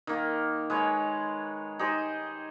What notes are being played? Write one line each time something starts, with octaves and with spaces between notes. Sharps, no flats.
D#3 A#3
G#3 B4 C#5
D#4 G4 G#4 C5